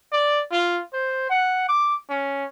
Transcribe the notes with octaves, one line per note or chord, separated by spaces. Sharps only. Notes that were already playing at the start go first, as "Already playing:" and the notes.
D5
F4
C5
F#5
D6
C#4